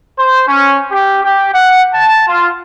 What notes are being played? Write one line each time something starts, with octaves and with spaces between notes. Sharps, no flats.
C5
C#4
G4
G4
F#5
A5
F4